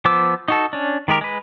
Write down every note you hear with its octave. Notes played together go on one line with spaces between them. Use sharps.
F3 B3 C5 D6 E6
D#4 F#4 A4
C#4 D4
D#3 G#3 G4 A#4
G#3 B4